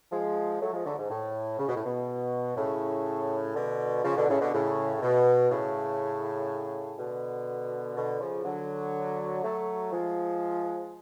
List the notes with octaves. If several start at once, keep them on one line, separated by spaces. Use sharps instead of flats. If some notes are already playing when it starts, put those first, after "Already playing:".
F3 G#3
F#3 A3
F3 G#3
D3 F#3
G#2
A2
C#3
B2
A2
B2
A2 C#3
B2 D3
C#3 F3
B2 D3
A2 C#3
B2 D3
A2 C#3
C#3
B2
A2 C#3
B2 D3
B2 D3
C#3 F3
D3 F#3
F#3 A3
F3 G#3